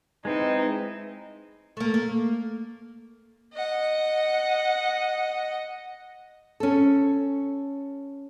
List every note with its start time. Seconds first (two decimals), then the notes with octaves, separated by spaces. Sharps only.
0.25 G#3 C4 D#4 E4 B4
1.77 A3 A#3
1.94 A#3
3.53 D#5 F#5
6.60 C#4 A4